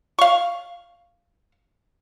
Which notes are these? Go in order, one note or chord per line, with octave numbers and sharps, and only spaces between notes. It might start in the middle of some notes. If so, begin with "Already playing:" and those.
F5 C#6